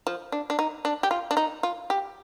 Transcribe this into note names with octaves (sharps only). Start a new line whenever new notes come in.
F3
D4
D4
D#4
D4
G4
F4
D4
D#4
F4
G4